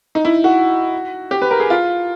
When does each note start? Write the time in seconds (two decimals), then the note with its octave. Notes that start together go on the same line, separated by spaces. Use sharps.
0.15 D#4
0.25 E4
0.44 F#4
1.31 G4
1.42 B4
1.51 A#4
1.60 G#4
1.70 F4